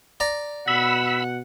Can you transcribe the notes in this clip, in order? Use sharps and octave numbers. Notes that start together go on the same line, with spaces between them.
D5 A#5
B2 F#5 B5 E6